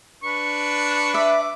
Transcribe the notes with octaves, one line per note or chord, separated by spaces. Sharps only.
D4 B4 C#6
E5 D6